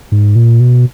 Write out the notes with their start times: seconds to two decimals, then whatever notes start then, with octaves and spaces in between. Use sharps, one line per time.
0.12 G#2
0.36 A#2
0.60 B2